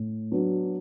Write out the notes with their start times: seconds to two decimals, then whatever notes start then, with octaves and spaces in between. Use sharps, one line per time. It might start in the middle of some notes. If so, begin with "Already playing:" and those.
Already playing: A2
0.31 F#3 B3 D4